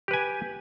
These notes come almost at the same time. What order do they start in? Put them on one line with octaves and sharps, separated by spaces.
G4 B4 G#5